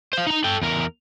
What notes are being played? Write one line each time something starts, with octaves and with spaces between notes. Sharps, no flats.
C5 F5
D#4 A#5
A4 G5
E2 A#4